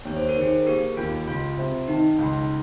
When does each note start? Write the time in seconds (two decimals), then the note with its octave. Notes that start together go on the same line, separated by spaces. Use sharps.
0.05 D#2 C#5
0.17 C5
0.29 A#4
0.37 D#3 G#4 C5
0.67 A#3 G4 A#4
0.97 D#2 F4
1.27 C#2 F4
1.57 C3
1.88 D#3 D#4
2.18 C#2